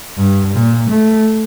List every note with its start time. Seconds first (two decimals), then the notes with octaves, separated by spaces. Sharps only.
0.18 G2
0.54 A#2
0.90 A3